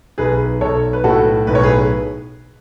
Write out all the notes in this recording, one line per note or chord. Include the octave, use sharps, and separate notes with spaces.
B1 G#4 B4
B1 A4 C#5
B4
A2 F#4 A4
B1 B4
C#5
G#4 B4